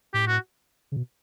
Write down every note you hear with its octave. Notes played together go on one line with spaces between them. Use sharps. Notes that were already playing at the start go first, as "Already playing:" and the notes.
A2 G4
F#4
C#3
B2